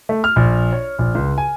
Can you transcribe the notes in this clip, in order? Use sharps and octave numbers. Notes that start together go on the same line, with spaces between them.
A3
F6
A#1
C#5
A#1
C#2
G#5